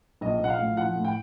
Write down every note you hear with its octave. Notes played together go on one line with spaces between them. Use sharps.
A#1 D#5
A#1 F#5
F5
A2
F3 F#5
A2
G5